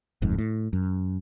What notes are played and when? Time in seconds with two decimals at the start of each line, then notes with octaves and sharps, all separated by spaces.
0.22 D1 F2 G#2
0.38 A2
0.73 F#2